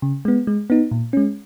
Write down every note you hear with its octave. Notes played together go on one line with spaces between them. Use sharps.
C#3
G#3 B3
G#3
B3 D#4
A#2
G#3 C#4